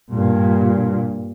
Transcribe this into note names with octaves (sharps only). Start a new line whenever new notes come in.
G2 A#2